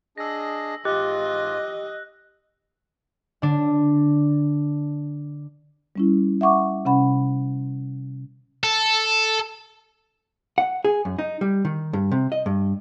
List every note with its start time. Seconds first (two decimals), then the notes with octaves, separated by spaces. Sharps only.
0.18 D4 G#4 D#5 E6 A#6
0.85 G#2 F4 G4 D#5 F#6
3.42 D3 D4
5.96 G3 C#4 E4
6.41 E5 F#5 C#6 D6
6.85 C3 C#4 F#5 B5
8.64 A4
10.58 F#5
10.85 G#4
11.05 F#2
11.19 D#4
11.41 G3
11.65 D#3
11.93 G2
12.11 C3
12.32 D#5
12.46 G2